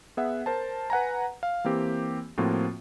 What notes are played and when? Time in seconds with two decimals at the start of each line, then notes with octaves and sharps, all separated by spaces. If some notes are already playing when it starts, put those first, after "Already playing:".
0.17 B3 G#4 E5 F#5
0.46 A#4 C5 A5
0.90 B4 F#5 G#5 A#5
1.43 F5
1.64 E3 A#3 C4 G4
2.38 A2 F3 A#3 C4 F4 F#4